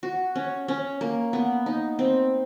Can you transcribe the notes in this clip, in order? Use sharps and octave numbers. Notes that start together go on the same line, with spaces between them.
F#4
C#4
C#4
A#3
B3
D#4
C4